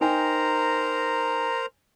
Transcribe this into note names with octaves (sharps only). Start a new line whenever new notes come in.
D#4 A#4 C5 G5 G#5 A#5